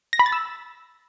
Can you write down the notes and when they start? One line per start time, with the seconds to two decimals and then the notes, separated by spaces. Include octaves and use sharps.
0.13 A#6
0.19 B5
0.26 A6
0.32 E6